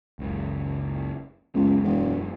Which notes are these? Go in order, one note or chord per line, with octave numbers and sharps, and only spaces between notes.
F#1 C#2
C#2 F#2 G#3 B3
E1